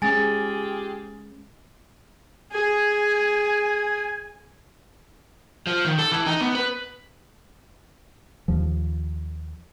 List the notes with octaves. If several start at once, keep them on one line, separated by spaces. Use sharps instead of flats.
G#3 C#4 F4 G4 G#4 G#5 A6
G#4 G#5
F3
D#3
A4
E3
D#4
B3
B4
D#2 F3